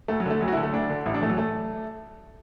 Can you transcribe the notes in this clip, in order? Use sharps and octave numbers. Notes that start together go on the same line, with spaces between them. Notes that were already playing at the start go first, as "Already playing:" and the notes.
D2 A3
F#3
D3 A3
D2 F#3
F#4
E4
D3
A3
D2 D4
D3
A1 E4
D4
A2 E3 F#3 A3
A3